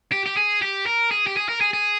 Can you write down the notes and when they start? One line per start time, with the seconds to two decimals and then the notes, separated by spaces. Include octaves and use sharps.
0.12 G4
0.26 G4
0.37 G#4
0.62 G4
0.86 A#4
1.11 G#4
1.27 G4
1.37 G#4
1.49 A#4
1.61 G#4
1.74 G#4